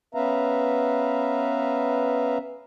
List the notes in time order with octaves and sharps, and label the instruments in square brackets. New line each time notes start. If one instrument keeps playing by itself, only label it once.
[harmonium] B3 C#4 B4 E5 F5 A#5